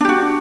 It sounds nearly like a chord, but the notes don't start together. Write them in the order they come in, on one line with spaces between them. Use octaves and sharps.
D4 G4 F#4